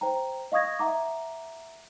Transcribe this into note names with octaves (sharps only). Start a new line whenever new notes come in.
C5 G5 A#5
D#5 F5 C#6 D#6 G#6 A#6
E5 F#5 A#5 D6